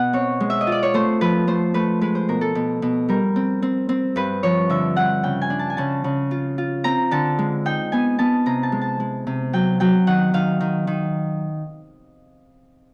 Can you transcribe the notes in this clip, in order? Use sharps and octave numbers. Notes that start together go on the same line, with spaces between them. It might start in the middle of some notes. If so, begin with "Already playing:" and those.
Already playing: B2 F#5
C4 C#5
G#3
E5
D#5
F4
D5
C#5
A3 C5
F3 B4
A3 C5
A3 B4
G#3 B4
C5
B2 A#4
A4
B2
B2
G3 A#4
C4
C4
C4
G2 B4
F3 C#5
D3 E5
G2 F#5
C#3 G5
G#5
D4
A5
G#5
C#3 A5
C#3
F4
F4
C4 A#5
D3 A5
G#3
D#4 G5
B3 G#5
B3 A5
C3 A#5
A5
G#3
A5
G#3
C3
F#3 G5
F#3 G5
D#3 F#5
D#3 F5
D#3
D#3